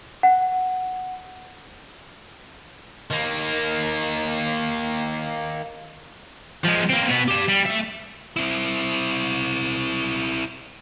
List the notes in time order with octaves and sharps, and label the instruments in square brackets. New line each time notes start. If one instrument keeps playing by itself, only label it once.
[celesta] F#5
[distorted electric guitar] D#3 A#3
F3 G#3
A#3 C4
B2 B3
G4 A5
G3
A3 E5
[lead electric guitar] C4 E4